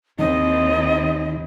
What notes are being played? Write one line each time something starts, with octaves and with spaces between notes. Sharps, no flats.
D#2 D#3 C4 E4 D#5